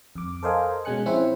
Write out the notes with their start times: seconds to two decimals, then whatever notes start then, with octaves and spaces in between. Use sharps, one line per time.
0.15 F2 D6
0.43 A4 A#4 C5 D#5 F5 G#5
0.85 B2 G#3 C#4 G#5 F#6 C#7
1.06 F3 C4 C#4 E4 C5 E5